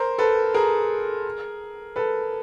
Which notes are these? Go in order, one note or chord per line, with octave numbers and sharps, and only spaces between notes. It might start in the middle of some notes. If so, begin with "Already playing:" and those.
Already playing: A#4 C5
A4 B4
G#4 A#4
A4 B4